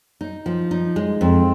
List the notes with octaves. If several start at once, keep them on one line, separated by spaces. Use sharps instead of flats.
D#4
F3
D#4
G#3
F2 C4